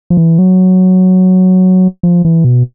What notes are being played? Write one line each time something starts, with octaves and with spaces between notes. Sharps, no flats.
F3
E3
F#3
F3
E3
B2